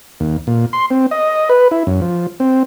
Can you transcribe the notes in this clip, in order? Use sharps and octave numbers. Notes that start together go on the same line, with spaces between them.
D#2
A#2
C6
C4
D#5
B4
E4
F#2
F3
C4